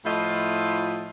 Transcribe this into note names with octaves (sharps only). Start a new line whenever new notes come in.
A2 F3 A3 E4 F4 D#5